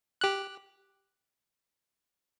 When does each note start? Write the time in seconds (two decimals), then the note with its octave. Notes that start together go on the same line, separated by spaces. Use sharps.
0.21 G4 F#6